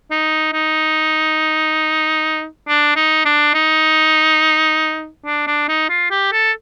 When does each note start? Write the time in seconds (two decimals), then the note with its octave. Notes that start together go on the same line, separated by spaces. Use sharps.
0.11 D#4
0.53 D#4
2.68 D4
2.96 D#4
3.25 D4
3.54 D#4
5.25 D4
5.47 D4
5.69 D#4
5.89 F4
6.11 G4
6.32 A4